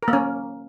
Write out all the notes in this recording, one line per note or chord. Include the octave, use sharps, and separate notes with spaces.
A#4
A#3
C#4